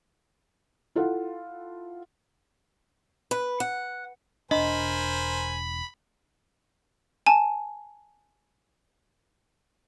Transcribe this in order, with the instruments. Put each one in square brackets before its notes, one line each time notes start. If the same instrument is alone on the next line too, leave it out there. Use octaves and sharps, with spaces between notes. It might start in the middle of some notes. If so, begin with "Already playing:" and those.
[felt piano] E4 F4 A4 F#5
[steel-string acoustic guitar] B4
F#5
[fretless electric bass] E1 D4 [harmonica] A#4 C5 G#5 [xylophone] D#5 [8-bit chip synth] B5
[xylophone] G#5 A5